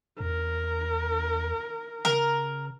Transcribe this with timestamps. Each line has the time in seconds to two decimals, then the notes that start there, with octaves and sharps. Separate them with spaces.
0.20 E2 A#4
2.05 C#3 A#4